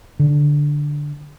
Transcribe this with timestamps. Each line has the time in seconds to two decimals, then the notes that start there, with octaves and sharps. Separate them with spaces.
0.19 D3